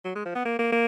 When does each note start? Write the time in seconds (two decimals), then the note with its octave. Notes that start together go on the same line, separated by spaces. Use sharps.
0.05 F#3
0.16 G#3
0.25 F3
0.35 B3
0.45 A#3
0.59 A#3
0.72 A#3